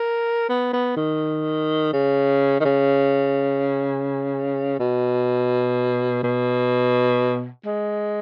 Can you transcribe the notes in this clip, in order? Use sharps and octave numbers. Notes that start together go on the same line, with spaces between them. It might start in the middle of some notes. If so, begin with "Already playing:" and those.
Already playing: A#4
B3
B3
D#3
C#3
D#3
C#3
B2
B2
G#3